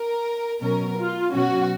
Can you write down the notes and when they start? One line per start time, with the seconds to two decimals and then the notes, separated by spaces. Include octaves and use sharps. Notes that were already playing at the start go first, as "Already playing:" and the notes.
Already playing: A#4
0.61 B2 F#3 C#4 A#4
0.98 F4
1.33 B2 F#3 C#4 F#4